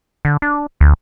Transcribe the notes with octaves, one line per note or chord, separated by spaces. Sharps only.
D3
D4
D2